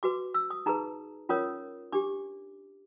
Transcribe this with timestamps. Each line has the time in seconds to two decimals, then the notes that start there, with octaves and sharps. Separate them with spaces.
0.03 F#4 B4 D6
0.34 E6
0.50 D#6
0.66 D#4 G#4 B4 A#5
1.29 C#4 F4 A#4 C#5 D#6
1.92 D4 G4 D6